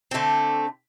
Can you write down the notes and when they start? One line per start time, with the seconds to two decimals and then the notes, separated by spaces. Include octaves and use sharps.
0.11 D3 A3 C4